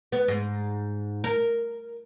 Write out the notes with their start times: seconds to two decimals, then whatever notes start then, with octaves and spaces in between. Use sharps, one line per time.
0.12 B3
0.28 G#2
1.24 A#4